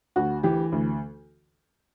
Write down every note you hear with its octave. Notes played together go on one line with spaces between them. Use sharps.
D2 F#4
E3 G4
D2